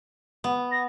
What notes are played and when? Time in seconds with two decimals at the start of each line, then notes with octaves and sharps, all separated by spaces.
0.44 B3
0.71 A#6